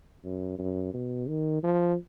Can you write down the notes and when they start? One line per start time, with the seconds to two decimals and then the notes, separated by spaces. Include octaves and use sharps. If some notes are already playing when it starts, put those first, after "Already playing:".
0.24 F#2
0.59 F#2
0.94 B2
1.28 D#3
1.63 F3